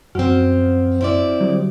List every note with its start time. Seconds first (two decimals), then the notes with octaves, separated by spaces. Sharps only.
0.15 F#2 F3 C4 F#4 F6
1.01 C4 E4 D5
1.41 D3 F#3 G3